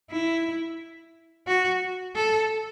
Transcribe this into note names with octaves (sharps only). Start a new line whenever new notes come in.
E4
F#4
A4